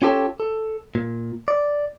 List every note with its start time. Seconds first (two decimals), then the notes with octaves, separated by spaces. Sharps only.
0.02 C#4 F4 G4 A4 C#5 A5
0.40 A4
0.95 A#2
1.48 D5